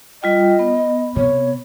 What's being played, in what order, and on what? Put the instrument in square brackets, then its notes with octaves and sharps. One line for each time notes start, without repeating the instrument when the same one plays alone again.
[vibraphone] G3 F4 G5 [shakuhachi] D#5
[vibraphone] B3
[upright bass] C3 [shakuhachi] C#5